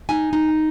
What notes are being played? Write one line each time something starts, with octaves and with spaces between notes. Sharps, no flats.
D#4 G#5
D#4